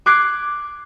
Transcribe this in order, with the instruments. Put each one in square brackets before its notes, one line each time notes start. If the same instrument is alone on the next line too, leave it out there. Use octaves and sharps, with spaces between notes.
[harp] D6 F#6 G#6 C7 D7